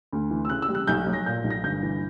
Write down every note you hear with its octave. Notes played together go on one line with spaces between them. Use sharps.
D2
E3
E6
C#3 F#6
E6
G3
F#6
B1 G6
F#3
A#6
A#2 G6
B1
A#6
G1 G6
E3